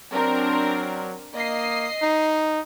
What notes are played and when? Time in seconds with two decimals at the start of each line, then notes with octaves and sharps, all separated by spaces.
0.13 F#3 C4 D4 A#4
1.35 A#3 D#5 C7
2.02 D#4